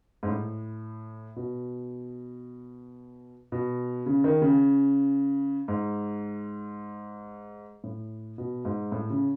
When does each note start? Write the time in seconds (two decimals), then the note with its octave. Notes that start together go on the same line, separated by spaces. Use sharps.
0.23 G#2
0.28 A2
1.36 B2
3.52 B2
4.06 C#3
4.24 D#3
4.42 C#3
5.68 G#2
7.84 A2
8.38 B2
8.65 G#2
8.92 A2
9.10 C#3